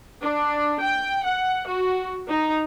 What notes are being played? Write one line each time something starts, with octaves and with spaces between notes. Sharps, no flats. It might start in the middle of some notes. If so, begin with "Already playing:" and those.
D4
G5
F#5
F#4
D#4